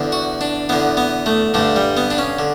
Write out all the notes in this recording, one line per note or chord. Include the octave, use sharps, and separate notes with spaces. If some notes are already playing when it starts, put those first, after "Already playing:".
Already playing: E2 D3
F#4
D4
E2 D3 B3
B3
A3
G2 D3 A3
G3
B3
D4
C#4
D3